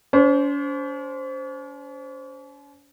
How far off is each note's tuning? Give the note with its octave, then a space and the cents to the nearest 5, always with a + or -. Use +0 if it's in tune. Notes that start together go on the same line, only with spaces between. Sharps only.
C#4 +45 C5 +0